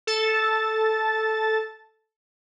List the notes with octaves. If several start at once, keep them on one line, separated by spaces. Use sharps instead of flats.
A4 A5 A6